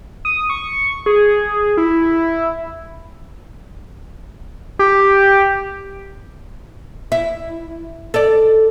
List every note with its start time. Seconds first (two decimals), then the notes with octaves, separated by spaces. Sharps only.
0.25 D#6
0.50 C#6
1.06 G#4
1.77 E4
4.79 G4
7.12 E4
8.14 A4 D5